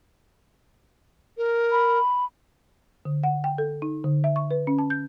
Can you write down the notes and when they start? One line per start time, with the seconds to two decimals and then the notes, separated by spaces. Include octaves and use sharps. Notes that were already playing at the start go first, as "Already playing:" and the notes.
1.37 A#4
1.72 B5
3.05 D3
3.24 F#5
3.44 G5
3.58 A4
3.82 D#4
4.04 D3
4.24 E5
4.36 C#6
4.51 B4
4.67 C#4
4.79 A5
4.90 G6